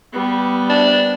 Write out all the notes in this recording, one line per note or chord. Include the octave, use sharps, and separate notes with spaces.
G3 B3
D4